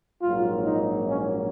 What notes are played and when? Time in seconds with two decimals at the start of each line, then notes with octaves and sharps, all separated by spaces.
0.22 A#1 G#2 F#3 A#3 F4
0.65 D#4
1.09 C#4